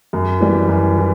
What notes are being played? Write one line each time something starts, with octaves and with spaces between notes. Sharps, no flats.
F#2
E3 G3
F#2
E3